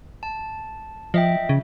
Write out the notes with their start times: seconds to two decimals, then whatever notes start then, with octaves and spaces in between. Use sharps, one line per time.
0.23 A5
1.14 F3 D#5 E5 G5
1.49 C#3